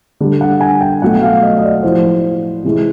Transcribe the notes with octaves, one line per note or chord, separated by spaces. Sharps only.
D3 G3
F#5
G#5
G5
B2 F#3 A3 F#5
F5
D#5
D#5
D5
A2 F3 G#3 C5
C3 E3 G#3